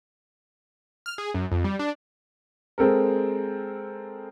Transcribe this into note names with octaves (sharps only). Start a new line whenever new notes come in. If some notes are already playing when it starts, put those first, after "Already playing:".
F6
G#4
F#2
F2
G3
D4
G#3 C4 A4 A#4